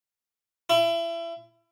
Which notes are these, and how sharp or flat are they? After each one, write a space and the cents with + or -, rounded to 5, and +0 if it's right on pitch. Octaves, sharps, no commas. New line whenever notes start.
E4 +30